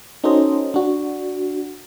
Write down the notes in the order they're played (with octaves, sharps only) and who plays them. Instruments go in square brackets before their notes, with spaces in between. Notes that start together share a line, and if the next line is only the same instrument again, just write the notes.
[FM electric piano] C#4 D#4 F#4 A4 C5 D#5
D4 F#4